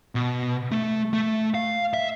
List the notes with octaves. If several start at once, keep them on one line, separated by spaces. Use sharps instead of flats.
B2
A3
A3
F5
E5